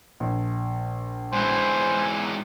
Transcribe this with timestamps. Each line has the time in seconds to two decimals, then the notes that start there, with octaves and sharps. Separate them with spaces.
0.20 A#1
1.33 G#2 E3 C5 G#5